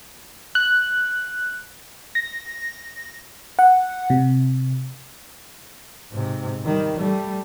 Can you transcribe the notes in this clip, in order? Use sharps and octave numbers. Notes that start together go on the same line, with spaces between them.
F#6
A#6
F#5
C3
G#2 C3
D#3 G3
G3 A3